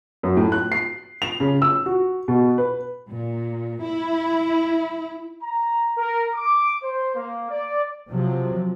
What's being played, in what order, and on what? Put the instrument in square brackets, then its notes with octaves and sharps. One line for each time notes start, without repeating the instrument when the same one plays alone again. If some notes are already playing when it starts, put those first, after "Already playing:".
[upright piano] F#2
A2
F#6
C7
F7
C#3
E6
F#4
B2
B4
[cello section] A#2
E4
[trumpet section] A#5
A#4
D6
C5
A#3
D5
[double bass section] C3 F3 F#3